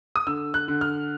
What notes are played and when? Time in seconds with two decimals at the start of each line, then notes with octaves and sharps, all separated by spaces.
0.16 D#6
0.27 D3 E6
0.54 F#6
0.68 D3
0.81 F6